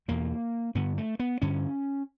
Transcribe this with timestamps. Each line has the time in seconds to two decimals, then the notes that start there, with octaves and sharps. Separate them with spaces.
0.08 E2 B2 A#3
0.75 G2 D3 B3
0.98 A3
1.19 B3
1.42 G2 D3 C#4